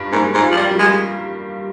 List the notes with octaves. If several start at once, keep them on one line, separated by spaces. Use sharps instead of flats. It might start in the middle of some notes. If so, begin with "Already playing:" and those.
Already playing: G2 F4
G#2 A#3
G#2
F4
F3
G3
G3
G#3